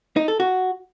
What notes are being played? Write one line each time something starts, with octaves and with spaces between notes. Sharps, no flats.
D#4
A4
F#4